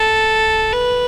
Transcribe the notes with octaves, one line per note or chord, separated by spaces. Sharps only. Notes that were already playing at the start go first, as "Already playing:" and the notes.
Already playing: A4
B4